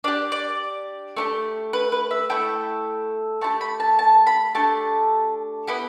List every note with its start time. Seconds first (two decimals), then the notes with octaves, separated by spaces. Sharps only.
0.04 D4 G4 D5
0.32 D5
1.16 A3 D4 G4
1.73 B4
1.92 B4
2.11 E5
2.29 A3 E4 A4 G5
3.41 A3 E4 G4 A5
3.61 B5
3.80 A5
3.99 A5
4.27 B5
4.55 A3 D4 G4 A5
5.67 B3 E4 G4 B5